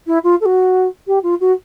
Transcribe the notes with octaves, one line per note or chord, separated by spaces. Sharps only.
E4
F4
A4
F#4
G4
F4
F#4